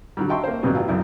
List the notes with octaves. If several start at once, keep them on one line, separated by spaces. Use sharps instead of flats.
D3 F#3 G3
D#5 E5 G5 A5 C6 C#6
A#3 C5
G2 B2 D3 F#3
A1 F4
B1 F#2 E4